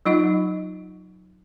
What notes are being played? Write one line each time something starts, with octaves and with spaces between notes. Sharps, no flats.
F#3 D#4 F4 D#5 F#5